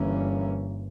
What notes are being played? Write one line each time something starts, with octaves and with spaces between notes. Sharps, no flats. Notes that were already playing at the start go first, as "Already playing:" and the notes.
Already playing: G1 G2 E3 A#3 C#4